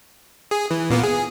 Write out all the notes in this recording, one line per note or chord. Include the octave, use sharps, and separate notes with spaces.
G#4
E3
A#2 A#3 B3
G#4